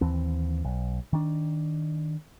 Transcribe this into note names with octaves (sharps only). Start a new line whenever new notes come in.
D#2 E3 C4
B1
D#3 D4